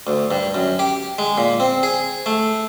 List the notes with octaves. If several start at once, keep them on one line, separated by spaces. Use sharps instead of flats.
D2
G2
F#2
G4
G#3
A#2
C4
G#4
A3